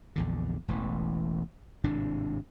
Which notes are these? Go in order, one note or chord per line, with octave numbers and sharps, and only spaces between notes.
A#1 E2 D3
E1 A1 E3
G#1 A2 C3 D4